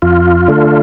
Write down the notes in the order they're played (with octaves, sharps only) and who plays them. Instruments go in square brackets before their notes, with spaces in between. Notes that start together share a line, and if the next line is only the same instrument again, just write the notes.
[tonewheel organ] F2 F4
D3 A3